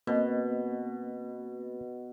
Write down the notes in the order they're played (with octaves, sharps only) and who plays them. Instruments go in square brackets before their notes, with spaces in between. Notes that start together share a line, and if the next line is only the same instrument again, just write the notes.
[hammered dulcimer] B2 [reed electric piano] A#3 C4 D#5